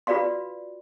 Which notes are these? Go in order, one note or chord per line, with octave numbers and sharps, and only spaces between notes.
F4 F#4 B4 D5 F5 C6